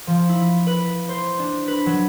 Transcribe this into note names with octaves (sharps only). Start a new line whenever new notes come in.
F3
E4
B4
C5
D4
B4
F#3